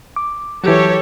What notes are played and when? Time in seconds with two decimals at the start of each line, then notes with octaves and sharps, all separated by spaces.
0.16 D6
0.64 E3 F#3 G4 A4 C#5